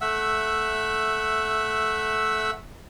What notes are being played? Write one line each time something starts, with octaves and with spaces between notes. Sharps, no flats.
A3 E5 F#5 E6